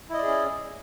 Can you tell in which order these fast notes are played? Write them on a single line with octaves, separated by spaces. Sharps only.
E4 D#5 D5 G#4 C#4